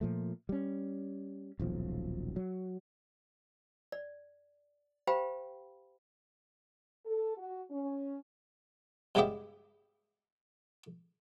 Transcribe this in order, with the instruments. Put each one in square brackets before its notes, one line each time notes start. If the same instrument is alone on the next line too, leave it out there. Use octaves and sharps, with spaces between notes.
[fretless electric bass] A#2 F3 A3
G3 C#4
D#1 B1 F3
F#3
[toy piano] D5
G4 C5 F5 G5 B5
[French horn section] A4
F#4
C#4
[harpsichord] G2 C#3 G#3 B3 G4 E5